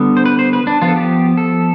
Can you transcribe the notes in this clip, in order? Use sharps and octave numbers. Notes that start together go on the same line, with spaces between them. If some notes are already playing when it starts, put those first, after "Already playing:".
Already playing: D3 G3 B3
C5
B4
C5
B4
D4
F3 B3 F4
A4
G4
A4